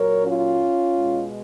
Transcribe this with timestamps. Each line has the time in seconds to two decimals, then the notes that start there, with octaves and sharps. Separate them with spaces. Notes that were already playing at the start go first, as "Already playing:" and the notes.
Already playing: A#2 F#3 A#4 C#5
0.24 C#4 F4
0.95 B2 G#3